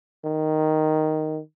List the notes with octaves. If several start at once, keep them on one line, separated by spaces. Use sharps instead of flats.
D#3